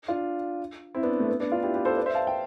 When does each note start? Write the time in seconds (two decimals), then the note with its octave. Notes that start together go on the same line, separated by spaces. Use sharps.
0.08 D4 F4
0.94 C4 E4
1.03 B3 D4
1.20 A3
1.29 B3
1.40 B3 D4
1.52 D4 F4
1.63 E4 G4
1.74 G4 B4
1.85 A4 C5
1.97 B4 D5
2.06 C5 E5
2.14 F5 A5
2.27 G5